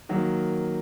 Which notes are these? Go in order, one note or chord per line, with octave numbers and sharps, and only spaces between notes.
D#3 F#3 A#3